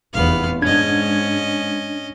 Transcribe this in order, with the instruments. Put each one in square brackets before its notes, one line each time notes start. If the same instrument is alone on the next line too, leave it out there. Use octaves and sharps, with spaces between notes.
[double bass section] F1 E2 [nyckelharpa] B3 F5
[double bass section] G#2 [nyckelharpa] C#4 D#5 [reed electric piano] D4 G#6